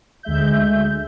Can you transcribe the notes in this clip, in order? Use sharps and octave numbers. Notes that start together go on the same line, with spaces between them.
D2 G#3 E5 G6